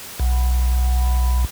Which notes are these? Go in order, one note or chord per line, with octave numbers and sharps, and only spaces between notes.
B1